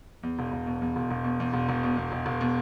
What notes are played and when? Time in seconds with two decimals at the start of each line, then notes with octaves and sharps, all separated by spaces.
0.23 E2
0.39 E1
0.52 E1
0.67 B2
0.82 E2
0.96 E1
1.11 E1
1.24 B2
1.40 E2
1.53 E1
1.69 E1
1.83 B2
1.97 E2
2.12 E1
2.26 E1
2.41 B2